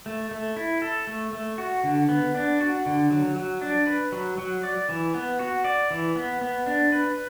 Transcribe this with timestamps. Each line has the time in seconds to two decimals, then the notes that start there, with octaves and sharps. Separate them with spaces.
0.06 A3
0.31 A3
0.56 E4
0.82 A4
1.07 A3
1.33 A3
1.58 F#4
1.84 D3
2.09 B3
2.35 D4
2.60 F#4
2.86 D3
3.10 F#3
3.36 F#3
3.61 D4
3.87 B4
4.12 F#3
4.38 F#3
4.63 D5
4.89 E3
5.14 B3
5.39 F#4
5.65 D5
5.91 E3
6.16 B3
6.42 B3
6.67 D4
6.92 B4